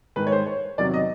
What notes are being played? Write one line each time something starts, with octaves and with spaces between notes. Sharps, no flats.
G#2 D#3 G#3 B4
C#5
C5
C#5
E2 C3 D#3 F#3 D5
D#5